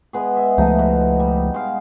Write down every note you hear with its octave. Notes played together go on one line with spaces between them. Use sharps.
G#3 B3 G#4
E5
C#2 F3 A3 D#4
B2
G3
G#3 F5